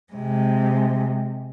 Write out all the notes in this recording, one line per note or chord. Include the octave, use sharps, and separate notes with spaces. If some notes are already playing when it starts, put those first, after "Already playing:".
C3 G#3